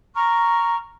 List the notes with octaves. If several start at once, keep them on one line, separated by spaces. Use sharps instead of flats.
A#5 C#6 F6